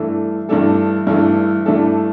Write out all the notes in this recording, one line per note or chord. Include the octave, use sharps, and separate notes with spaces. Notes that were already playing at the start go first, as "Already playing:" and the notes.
Already playing: G2 E3 A3 D4 A4
G2 E3 A3 D4 A4
G2 E3 A3 D4 A4
G2 E3 A3 D4 A4